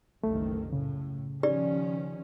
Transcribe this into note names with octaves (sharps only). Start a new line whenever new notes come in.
F#1 C2 D#3 A3
A2 C#3
D#3 F3 C#4 G4 D5